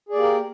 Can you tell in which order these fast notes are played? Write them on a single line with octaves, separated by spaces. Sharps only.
G#4 D5 A#3 G4 A#4